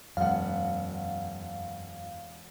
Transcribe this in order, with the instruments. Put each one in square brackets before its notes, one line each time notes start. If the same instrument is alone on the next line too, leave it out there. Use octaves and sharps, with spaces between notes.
[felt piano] E1 F#5 [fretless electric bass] F#2 [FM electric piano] F5